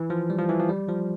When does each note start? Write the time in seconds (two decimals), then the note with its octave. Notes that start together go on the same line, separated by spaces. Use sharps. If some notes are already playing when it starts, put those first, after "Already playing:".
Already playing: E3
0.10 F3
0.30 G3
0.39 F3
0.49 E3
0.60 F3
0.69 G3
0.89 F3